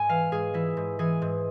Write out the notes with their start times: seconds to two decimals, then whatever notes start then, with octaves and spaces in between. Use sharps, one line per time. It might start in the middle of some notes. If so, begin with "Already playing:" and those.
Already playing: G#2 G#5
0.09 E3 F5
0.32 G#2 G#4
0.54 E3 E4
0.77 G#2
0.99 E3 G#4
1.22 G#2